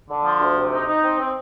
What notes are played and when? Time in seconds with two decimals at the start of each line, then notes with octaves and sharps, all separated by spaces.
0.08 D3
0.24 F3
0.40 D2
0.56 C3
0.72 D#4
0.88 D#4
1.03 C4
1.19 C4